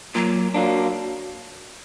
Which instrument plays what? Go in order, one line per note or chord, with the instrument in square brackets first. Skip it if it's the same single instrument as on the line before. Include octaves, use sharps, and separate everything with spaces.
[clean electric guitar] A#2 [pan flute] F#3
[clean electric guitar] F#3 A#3 D4